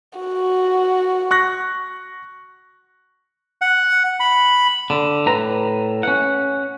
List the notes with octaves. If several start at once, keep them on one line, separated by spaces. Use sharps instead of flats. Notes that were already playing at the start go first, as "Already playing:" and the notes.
F#4
C#6 F#6 A#6
F#5
B5
D3
A2 B4 A#5
C#4 F#5